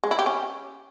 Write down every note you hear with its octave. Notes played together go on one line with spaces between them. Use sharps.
G#3
E4
G4
C#4